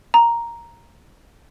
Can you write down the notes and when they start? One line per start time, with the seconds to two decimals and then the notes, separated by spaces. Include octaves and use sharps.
0.14 A#5